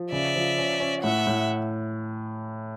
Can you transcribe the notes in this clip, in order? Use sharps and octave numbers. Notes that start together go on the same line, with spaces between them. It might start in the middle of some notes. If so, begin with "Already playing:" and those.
Already playing: F3
C#3 D5 E5
F3
C#4
C#4
A2 E5 F#5
A2